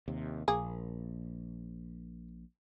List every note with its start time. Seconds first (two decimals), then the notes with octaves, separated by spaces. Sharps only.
0.08 D#2 C3
0.48 A#1 A#3 G#4